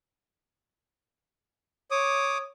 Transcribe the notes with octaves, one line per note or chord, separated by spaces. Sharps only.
C#5 D6 D#6